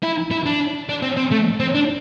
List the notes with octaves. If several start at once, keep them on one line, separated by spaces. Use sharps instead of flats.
E4
E4
D4
D4
C4
C4
A3
C4
D4